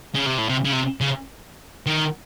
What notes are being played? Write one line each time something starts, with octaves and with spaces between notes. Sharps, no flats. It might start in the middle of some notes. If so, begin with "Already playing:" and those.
C#3
C3
A2
C3
C#3
C3
C#3
D#3